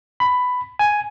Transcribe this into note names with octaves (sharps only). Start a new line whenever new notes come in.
B5
G#5